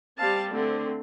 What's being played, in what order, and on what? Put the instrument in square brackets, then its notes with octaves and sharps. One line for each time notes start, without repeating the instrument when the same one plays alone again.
[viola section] G3 C4 F5 A5
D3 A3 C4